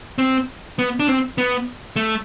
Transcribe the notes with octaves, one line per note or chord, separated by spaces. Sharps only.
C4
B3
D4
C4
B3
A3